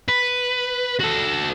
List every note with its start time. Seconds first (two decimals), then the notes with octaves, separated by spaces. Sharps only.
0.09 B4
1.00 F#4 A4